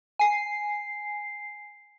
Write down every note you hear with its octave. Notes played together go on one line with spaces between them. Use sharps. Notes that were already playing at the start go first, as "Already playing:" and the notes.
G#5 C7